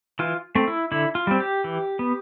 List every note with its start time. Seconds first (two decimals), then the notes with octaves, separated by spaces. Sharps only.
0.19 E3 F4
0.55 A3 C4
0.68 E4
0.92 D3 E4
1.15 F4
1.27 G3 C4
1.40 G4
1.64 E3
1.99 B3